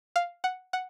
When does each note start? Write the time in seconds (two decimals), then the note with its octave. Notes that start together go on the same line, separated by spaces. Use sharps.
0.16 F5
0.44 F#5
0.73 F#5